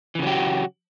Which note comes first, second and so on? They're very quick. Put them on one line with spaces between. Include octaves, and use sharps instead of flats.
E3 C#3 F#3 G4 F#4